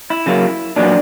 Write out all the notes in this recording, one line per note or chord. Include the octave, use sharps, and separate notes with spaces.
E4
C#3 F#3 A#3
A#2 F#3 B3 D4